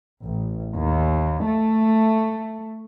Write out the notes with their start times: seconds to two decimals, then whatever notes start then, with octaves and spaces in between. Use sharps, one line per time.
0.26 A1
0.73 D#2
1.46 A3